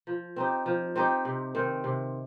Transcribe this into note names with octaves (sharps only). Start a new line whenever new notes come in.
F3
C4 D#4 G4
F3
C4 D#4 G4
C3
D#3 C4
C3